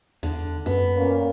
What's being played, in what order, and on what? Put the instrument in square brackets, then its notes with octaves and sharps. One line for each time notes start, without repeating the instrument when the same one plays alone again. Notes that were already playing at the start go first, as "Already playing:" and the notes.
[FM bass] E2 [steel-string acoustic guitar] D3
[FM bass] F#2 [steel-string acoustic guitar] B3
[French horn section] A#2 A#3 C#4